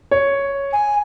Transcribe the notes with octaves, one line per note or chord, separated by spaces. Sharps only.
C#5
G#5